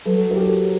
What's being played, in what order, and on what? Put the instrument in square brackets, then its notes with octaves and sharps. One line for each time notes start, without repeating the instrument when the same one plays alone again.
[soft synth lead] F#3 [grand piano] A4 B4
[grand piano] A#4
G4 A4